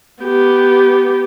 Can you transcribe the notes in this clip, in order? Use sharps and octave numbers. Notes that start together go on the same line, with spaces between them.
B3 G4